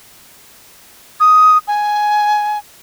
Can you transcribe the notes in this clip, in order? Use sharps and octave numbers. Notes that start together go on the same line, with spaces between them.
D#6
G#5